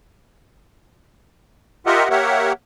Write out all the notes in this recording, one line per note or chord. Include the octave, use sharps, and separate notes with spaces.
F4 G4 A#4 D#5 E5 F#5
A#3 G4 A#4 C#5 E5 F#5